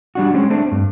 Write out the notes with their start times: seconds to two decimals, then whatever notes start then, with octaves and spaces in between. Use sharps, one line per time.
0.15 G3 D4 F#4
0.34 G#3 C4 C#4
0.50 A3 C4 D4
0.71 G2